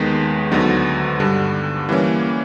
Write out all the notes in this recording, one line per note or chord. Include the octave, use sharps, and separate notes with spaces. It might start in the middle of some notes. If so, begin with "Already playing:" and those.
Already playing: D#2 D#3 G#3 B3
D2 D3 F#3 B3 D#4
G2 D3 G3
E3 G3 A#3 C#4